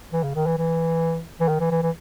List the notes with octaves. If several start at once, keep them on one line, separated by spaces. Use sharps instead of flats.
E3
C#3
D#3
E3
E3
E3
D#3
E3
E3
E3